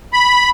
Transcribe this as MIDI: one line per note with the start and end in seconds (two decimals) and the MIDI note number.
0.13 0.50 83